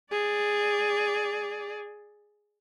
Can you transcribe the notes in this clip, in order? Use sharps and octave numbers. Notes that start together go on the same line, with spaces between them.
G#4 D5